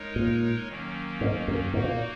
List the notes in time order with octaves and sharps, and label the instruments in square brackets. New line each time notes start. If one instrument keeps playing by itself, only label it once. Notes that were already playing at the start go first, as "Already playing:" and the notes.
Already playing: [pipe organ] G#3 D#4 A#4 C#5
[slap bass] A#2
[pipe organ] D#3 F#3 A#3 C#4
[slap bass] G#2
F#2
[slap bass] G#2 [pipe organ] A#3 D#4 F#4
[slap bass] A#2